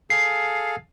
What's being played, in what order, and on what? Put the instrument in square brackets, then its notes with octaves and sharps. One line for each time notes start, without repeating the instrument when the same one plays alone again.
[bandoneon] G#4 A4 F5 [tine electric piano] C7